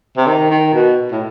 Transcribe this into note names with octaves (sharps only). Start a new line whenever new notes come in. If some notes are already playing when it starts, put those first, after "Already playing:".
C3
D#3
D#3
B2
A2